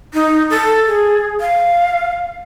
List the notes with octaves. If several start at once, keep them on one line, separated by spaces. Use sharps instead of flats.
D#4
A4
G#4
F5